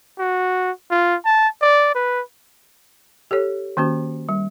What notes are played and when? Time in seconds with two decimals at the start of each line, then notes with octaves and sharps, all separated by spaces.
0.19 F#4
0.90 F4
1.25 A5
1.62 D5
1.95 B4
3.31 G4 A4 C#5
3.77 D#3 A#3 C#4 F#4
4.29 G3